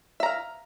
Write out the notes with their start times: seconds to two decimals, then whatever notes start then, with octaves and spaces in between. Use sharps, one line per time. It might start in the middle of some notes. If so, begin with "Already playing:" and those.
0.20 E5
0.23 A#5
0.26 F5